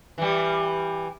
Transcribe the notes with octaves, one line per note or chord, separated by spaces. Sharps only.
E3 G3